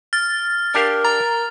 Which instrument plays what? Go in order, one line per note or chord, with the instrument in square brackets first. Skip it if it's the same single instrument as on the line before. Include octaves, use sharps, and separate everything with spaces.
[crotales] F6 [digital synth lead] A6
[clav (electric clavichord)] D4 G4 F5 [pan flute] A#4
[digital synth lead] A#5 [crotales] A6